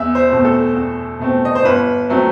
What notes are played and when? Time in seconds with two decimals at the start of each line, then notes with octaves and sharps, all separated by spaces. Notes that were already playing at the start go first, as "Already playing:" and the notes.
Already playing: E2 E5
0.15 C5
0.29 B2 A3 C4
0.45 A4
0.75 E2
1.19 B2 A3 C4
1.45 D#5
1.55 C5
1.64 G1 B4
2.10 F#3 A3 C4